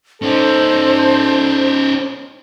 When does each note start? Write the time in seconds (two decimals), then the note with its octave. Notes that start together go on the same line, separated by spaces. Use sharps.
0.22 C#4 D#4 A4 C5